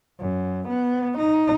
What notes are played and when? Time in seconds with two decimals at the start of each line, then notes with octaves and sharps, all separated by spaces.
0.20 F#2
0.68 B3
1.18 D#4